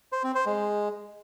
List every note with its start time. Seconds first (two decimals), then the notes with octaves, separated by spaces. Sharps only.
0.12 C5
0.24 C4
0.35 C5
0.46 G#3